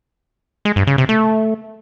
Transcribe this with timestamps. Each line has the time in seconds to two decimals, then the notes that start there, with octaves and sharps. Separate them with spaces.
0.65 G#3
0.76 G2
0.87 C#3
0.98 C3
1.09 A3